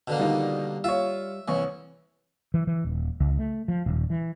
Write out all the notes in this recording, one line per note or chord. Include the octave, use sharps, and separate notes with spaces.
B2 D3 A#3
D#3 G3 D#4 F4
F4 C#5 E5
C2 E3 C#5
E3
E3
D#1
C#2
A3
F3
D#1
E3